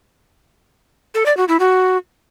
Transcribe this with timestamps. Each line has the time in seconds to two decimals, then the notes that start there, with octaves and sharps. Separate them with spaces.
1.15 A4
1.26 D5
1.37 F#4
1.48 E4
1.60 F#4